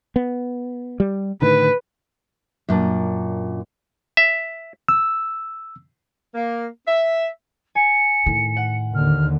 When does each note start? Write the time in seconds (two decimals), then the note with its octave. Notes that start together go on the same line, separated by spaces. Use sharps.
0.16 B3
1.00 G3
1.42 A2 D3 D#3 B4
2.69 F#2 A#2 D4
4.17 E5
4.88 E6
6.35 A#3
6.87 E5
7.75 G#5 C#7
8.26 A2 D#3
8.57 F#5
8.94 D#2 D3 F6